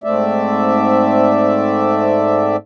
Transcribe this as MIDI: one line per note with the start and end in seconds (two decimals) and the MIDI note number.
0.04 2.56 44
0.04 2.56 57
0.04 2.56 60
0.04 2.56 74
0.04 2.56 76